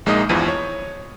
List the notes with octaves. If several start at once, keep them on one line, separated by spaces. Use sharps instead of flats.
A#1 G#3 A#3 D#4 D#5 D#6
E2 G2 E3 F3 D#7
C#5